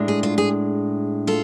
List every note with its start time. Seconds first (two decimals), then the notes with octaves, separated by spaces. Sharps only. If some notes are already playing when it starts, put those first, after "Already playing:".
Already playing: A2 G#3 D4
0.08 G#4
0.23 F4
0.38 G#4
1.27 F4 A4